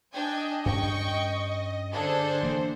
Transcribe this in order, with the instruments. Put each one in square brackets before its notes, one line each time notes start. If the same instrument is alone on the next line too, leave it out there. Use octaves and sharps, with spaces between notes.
[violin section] D4 G5 G#5 [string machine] D#5
[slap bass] G2 C#4 [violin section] G5 C#6
[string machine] D3 C5 [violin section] D4 G#4 A4
[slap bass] E3 A#3